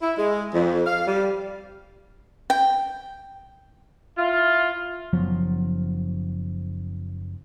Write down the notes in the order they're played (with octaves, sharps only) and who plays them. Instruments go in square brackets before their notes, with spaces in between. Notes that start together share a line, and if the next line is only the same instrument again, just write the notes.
[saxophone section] E4
G#3
F2
F5
G3
[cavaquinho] G5
[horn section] E4 F4
[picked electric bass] F#1 F3 F#3 B3